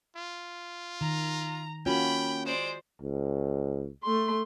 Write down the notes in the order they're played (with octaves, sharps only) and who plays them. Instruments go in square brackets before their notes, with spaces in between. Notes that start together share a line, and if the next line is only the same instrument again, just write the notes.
[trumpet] F4
[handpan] D#3 [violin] A#5
[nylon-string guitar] A#3 C#4 [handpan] F4 F#4 [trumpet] G5 [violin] B5
[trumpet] G#3 [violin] C5 D5
[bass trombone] C#2
[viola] A3 C6